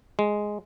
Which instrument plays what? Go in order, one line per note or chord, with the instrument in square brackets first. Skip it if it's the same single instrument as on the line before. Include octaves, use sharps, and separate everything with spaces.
[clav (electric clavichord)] G#3